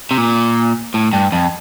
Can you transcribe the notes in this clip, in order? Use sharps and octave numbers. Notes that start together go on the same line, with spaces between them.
C3
A#2
A2
G2
F2